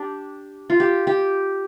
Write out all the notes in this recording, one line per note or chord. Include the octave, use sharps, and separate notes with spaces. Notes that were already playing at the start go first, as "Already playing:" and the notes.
Already playing: D4 G4
F4
G4
G4